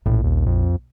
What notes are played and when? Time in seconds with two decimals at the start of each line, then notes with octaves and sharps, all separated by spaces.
0.06 A#1 A2
0.24 D#2
0.46 F2